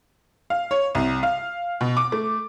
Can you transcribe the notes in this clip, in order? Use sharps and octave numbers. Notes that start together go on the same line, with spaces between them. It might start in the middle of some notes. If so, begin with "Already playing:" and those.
F5
C#5
C2
F5
B2
D6
A3